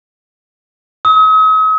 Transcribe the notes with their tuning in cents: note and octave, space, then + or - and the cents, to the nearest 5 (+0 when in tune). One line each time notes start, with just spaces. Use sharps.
D#6 +45